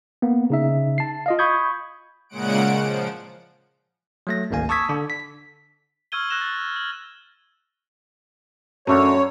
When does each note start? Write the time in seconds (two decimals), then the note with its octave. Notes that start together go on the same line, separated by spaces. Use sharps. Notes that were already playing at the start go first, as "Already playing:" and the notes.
0.22 A#3 B3
0.50 C#3 D#4 E5
0.98 A5 C7
1.26 F4 D#5 F5
1.39 B5 C#6 D#6 G6 G#6
2.29 A#2 C#3 G#3 F#5 D7
2.77 F3
4.27 F#3 A3 A#6
4.51 G#1 D2 A#3 F5 G#5
4.69 A5 C#6 D#6 E6 G#6 B6
4.89 D3 D4
5.10 B6
6.12 C#6 E6 F6 G#6 D#7 G7
6.29 E6 F#6 A#6 E7 F7 G7
6.41 A6
6.56 E6
6.76 F#7
8.87 F#2 D3 A3 A#4 C#5